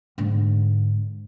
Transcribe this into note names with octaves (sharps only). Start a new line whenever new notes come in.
G#2 D3